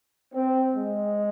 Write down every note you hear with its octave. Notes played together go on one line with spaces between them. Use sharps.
C4
G#3